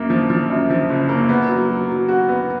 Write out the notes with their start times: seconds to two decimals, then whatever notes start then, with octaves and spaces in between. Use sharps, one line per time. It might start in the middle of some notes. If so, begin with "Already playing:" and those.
Already playing: F#2 A#3
0.10 F3
0.30 F3
0.50 F#2
0.70 F3
0.90 F#1
1.09 A#3
1.29 B3
1.49 F#3
1.69 F#3
1.89 F#3
2.09 F#4
2.29 B3